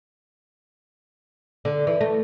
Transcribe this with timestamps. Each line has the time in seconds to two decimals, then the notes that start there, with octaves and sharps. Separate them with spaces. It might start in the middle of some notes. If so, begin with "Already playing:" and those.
1.65 D3
1.87 E3
2.01 A3